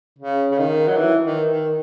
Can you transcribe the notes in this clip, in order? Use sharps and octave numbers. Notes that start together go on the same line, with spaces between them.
C#3
C#3
D#3
F#3
E3
D#3
D#3